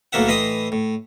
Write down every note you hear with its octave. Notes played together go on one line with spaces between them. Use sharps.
B1 A2 A#3 F4 E5 F#5
A2 E3 D#5 B5 C6 D#6
A2